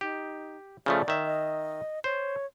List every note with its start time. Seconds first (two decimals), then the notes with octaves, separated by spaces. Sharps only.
0.01 D#4 G4
0.86 C#3 F3 A3 D5
1.08 D#3 E5
1.26 D#5
2.04 C5 C#5